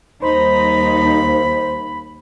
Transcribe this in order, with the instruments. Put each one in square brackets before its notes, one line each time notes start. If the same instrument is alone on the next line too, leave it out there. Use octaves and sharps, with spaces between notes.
[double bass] D#2 [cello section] G3 D#4 [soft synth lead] C5 [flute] B5